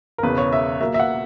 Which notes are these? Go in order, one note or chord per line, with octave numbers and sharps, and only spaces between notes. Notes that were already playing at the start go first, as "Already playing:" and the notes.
A#4
E1 E2 C#3 B4
C#5
E5
B1 A#2 F#3 A#3 E5
E5
F#5